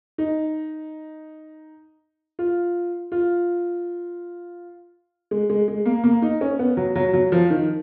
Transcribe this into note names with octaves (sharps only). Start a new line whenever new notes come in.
D#4
F4
F4
G#3
G#3
G#3
A#3
A#3
D#4
C#4
B3
F#3
F#3
F#3
F3
D#3